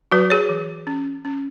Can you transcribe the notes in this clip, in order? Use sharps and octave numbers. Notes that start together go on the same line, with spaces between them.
F#3 F#4 B4
G#4 C#5
E3
C#4
C#4